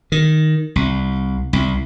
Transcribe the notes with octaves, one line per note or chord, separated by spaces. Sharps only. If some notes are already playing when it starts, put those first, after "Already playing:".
D#3
C2
C2